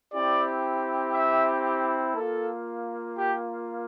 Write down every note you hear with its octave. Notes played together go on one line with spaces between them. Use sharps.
C4 E4 G4 D5
E5
A#3 F4 A4
G4